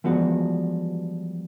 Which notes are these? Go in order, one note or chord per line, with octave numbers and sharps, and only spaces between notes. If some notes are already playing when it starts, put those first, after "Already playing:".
E3 F3 G3 G#3 B3 F#4